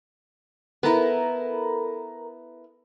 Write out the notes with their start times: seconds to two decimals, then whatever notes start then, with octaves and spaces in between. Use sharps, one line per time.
0.83 B3 E4 A4 A#4 A#5